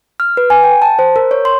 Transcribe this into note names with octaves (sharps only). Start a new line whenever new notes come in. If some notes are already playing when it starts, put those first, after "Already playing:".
F6
B4
G#5
G5
A5
C5
A#4
C#5
C6